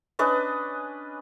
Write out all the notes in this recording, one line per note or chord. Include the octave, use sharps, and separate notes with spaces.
C#4 D4 B4 D#5